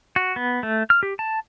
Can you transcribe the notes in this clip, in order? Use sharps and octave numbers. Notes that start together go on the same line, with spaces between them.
F#4
B3
A3
F6
G4
A5